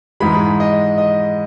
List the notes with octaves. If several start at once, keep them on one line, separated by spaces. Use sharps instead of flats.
G#2 E3 G#3 B5
D#5
D#5